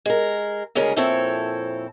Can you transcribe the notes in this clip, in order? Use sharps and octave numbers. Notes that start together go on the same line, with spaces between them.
G#3 A#4
D2 C#3 G#3 C#4 A#4
F2 A#2 C4 E4 A4 C#5